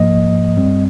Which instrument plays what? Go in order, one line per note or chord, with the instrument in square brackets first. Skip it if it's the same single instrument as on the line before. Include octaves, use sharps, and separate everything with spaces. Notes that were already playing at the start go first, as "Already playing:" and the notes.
Already playing: [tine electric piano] G#2 F3 A#3 D#5
G2 G3 C4